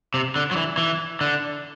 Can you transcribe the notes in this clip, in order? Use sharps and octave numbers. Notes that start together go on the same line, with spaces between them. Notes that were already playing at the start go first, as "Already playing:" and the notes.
C3
D3
F#3
E3
E3
D3